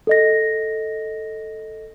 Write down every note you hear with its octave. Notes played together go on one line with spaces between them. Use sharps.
A4 D#5 A#6